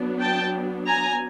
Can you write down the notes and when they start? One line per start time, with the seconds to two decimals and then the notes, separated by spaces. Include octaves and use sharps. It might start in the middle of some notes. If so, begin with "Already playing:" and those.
Already playing: F#3 B3 D4
0.20 G5 A5
0.87 G#5 A#5